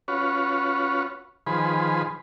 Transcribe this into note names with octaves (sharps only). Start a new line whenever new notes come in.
C#4 F4 F#4 B4 C#5
D#3 F3 G#4 B4 C5 B5